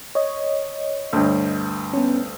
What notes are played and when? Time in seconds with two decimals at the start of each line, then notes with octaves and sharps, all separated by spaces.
0.15 C#5 D#5
1.13 D2 G2
1.93 B3 C#4